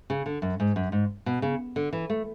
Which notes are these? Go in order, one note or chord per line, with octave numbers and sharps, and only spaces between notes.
C#3
D3
F#2
G#2
F#2
G#2
B2
C#3
D3
E3
A3